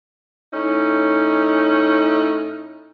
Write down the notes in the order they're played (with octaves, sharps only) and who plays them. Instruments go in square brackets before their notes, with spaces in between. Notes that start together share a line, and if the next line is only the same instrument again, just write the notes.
[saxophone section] A2 C#4 D#4